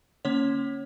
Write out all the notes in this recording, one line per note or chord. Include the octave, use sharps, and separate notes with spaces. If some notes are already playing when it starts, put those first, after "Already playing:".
D3 A#3 C#4 C#5